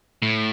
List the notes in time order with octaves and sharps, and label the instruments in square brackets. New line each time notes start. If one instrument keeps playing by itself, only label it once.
[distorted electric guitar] A2